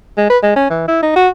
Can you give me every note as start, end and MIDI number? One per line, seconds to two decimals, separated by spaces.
0.18 0.28 56
0.30 0.38 71
0.43 0.54 56
0.56 0.69 61
0.70 0.84 52
0.88 1.02 64
1.02 1.13 63
1.16 1.28 66